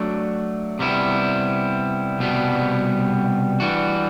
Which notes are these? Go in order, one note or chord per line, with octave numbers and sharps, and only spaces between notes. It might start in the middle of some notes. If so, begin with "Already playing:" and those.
Already playing: F#3 A3 D4
C3 G3 B3 E4
C2 B2 G3 B3
E3 G3 D4 F#4